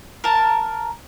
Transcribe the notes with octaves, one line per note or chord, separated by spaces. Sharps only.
A#4 A5